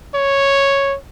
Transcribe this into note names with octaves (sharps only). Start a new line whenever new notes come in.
C#5